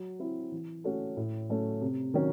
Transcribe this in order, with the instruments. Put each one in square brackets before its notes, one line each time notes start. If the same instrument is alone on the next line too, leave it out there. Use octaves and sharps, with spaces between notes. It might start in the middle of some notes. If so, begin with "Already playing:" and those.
Already playing: [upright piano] F#3
C4 E4
E3
A3 C#4 F#4 A4
A2
F#3 A3 C#4
C3
D#3 F#3 C#4